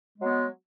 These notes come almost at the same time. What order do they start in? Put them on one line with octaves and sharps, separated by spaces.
G#3 F#3 B3